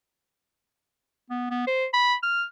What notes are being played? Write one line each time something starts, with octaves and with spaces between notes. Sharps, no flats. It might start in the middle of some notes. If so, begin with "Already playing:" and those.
B3
B3
C5
B5
F6